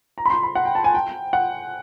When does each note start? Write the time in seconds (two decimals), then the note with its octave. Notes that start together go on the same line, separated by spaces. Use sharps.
0.18 A#5
0.26 B5
0.30 C6
0.43 B5
0.55 F#5
0.65 G5
0.75 A5
0.84 G#5
0.94 G5
1.33 F#5